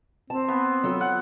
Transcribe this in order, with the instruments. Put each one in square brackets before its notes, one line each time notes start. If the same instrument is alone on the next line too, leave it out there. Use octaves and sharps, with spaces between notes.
[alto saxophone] C4 [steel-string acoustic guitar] A5
[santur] B3
[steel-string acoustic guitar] F#3 F4 A4
[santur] F#5